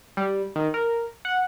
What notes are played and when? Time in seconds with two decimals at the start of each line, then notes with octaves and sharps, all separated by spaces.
0.17 G3
0.56 D#3
0.74 A#4
1.25 F#5